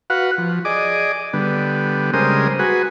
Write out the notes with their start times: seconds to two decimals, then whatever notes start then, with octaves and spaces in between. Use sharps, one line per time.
0.10 F#4 B4 F5 F#5
0.38 F3
0.65 G#4 D5 D#5 D6
1.33 D3 G3 B3
2.13 C#3 G3 G#3 A#4 C5 D#6
2.59 F#4 G#4 B4